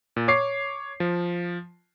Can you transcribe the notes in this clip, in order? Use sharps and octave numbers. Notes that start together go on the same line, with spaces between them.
A#2
C#5 D6 C7
F3